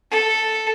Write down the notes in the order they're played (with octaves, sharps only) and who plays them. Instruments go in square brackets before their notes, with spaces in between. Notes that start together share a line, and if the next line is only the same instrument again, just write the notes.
[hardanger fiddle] A4